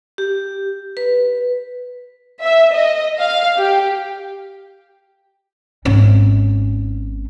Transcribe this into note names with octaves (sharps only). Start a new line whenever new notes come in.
G4
B4
E5
D#5
F5
G4
G#1 C#4